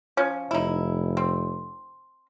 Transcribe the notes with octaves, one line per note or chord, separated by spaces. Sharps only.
F3 C#4
F1 D#4 E4
C4